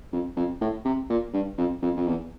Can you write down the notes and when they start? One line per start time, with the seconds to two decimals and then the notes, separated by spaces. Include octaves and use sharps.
0.12 F2
0.36 F2
0.61 A2
0.85 C3
1.10 A#2
1.33 G2
1.58 F2
1.82 F2
1.97 F2
2.07 E2